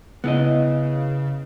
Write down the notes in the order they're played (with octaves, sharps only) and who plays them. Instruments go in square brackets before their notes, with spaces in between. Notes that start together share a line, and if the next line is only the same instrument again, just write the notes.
[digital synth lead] C#3 [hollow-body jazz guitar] B3 E4 D#5